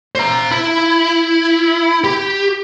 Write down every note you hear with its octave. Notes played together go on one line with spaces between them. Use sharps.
C5 A#5
E4
G4